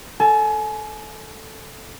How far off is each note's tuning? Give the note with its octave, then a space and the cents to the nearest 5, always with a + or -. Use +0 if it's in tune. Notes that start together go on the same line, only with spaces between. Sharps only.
A4 +0 G#5 +30